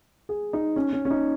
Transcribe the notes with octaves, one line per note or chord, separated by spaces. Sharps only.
G#4
D#4
C#4
C#4
C#4
D#4